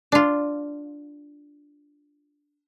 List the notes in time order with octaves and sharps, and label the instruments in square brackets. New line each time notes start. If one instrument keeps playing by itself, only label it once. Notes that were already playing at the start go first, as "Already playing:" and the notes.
[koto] D4 F4